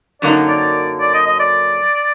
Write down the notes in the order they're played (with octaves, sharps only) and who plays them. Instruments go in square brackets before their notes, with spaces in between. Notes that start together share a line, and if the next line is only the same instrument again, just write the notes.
[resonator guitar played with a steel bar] F#2 D3 F#3 A#3 D#4 [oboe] D5
[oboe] D5
D5
D#5
D#5
D5